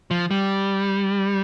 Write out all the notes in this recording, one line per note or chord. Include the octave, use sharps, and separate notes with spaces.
F3
G3